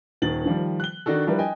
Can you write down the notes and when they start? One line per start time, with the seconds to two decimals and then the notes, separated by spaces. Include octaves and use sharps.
0.22 D#1 D#3 A6 F#7
0.46 D#3 F3 G3
0.80 F#6 G7
1.06 D#3 D4 F#4 A4
1.27 F3 G3 D4 E4 A#4 B4
1.38 D#5 G5 G#5